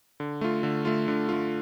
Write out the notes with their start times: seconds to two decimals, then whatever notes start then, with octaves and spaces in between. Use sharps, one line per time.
0.20 D3
0.41 A3 F4
0.63 D3
0.85 A3 F4
1.08 D3
1.29 A3 F4